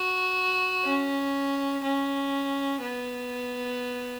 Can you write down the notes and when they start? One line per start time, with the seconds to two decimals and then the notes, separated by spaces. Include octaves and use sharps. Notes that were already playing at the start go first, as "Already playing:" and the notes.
Already playing: F#4
0.85 C#4
1.84 C#4
2.82 B3